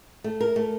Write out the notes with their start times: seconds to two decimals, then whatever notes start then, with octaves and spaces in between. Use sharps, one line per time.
0.24 A3
0.40 A#4
0.56 A3